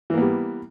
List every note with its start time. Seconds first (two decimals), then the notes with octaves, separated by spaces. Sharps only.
0.10 E3
0.14 A#3
0.18 B3
0.21 G3